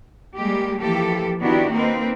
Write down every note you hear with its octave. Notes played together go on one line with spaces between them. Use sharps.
G3 G#3 A#3 G4
E3 F3 A#3 G4 A4
D#3 B3 D4 E4 F#4 G4
A#3 C4 D#4 B4